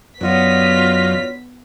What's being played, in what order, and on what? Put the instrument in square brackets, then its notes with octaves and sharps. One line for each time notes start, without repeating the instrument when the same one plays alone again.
[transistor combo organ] F#2 [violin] B3 B6 [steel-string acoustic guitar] D4 F#4 C#5 [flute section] F4 D#5